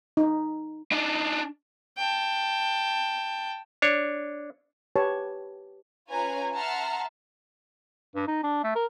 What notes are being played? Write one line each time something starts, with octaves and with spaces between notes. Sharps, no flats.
D#4
D4 D#4
G5 A5
D4 C#5
G4 B4 C#5 A5
C#4 F4 B4 C#5 G#5 A#5
E5 F#5 A5 A#5 C6 F6
G2
D#4
D4
A3
A#4